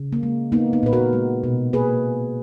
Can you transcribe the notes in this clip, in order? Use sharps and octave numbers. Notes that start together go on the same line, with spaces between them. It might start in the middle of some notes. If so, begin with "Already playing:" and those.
Already playing: C#3
A#3
G#3
A#3 B3 D#4
B3 D#4
A#2 B4
F#4 A#4
G#3
B2
A#3 G#4 B4